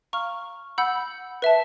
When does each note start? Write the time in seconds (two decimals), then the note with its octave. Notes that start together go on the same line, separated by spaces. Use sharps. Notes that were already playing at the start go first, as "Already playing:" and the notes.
0.13 F5 A#5 C#6 F6
0.78 F#5 B5 E6 G6
1.42 B4 E5 A5